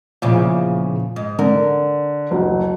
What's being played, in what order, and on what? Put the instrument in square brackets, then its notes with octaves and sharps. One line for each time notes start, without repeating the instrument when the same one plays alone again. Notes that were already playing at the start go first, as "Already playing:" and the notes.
[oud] E2 A#2 C#3 [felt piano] F3
[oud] G#2
[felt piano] D3 [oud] A#4
[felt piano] F#1 D2